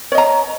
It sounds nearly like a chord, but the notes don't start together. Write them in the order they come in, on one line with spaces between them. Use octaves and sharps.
C#5 D#5 A#5